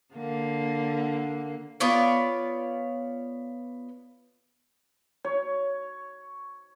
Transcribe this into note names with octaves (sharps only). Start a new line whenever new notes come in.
D3 A#3
B3 F4 C#5 D5
C#5